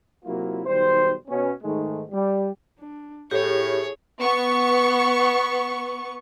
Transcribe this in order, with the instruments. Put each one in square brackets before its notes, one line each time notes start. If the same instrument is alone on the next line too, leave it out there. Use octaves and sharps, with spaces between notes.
[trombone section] C3 F#3 A#3 E4 F4
B1 D#3 G3 C5
B2 B3 C#4
G#2 D#3 G#3 A3
G3
[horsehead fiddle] D4
[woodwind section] A2 [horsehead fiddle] E4 G#4 [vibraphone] G4 [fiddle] C#5
[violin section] B3 C#6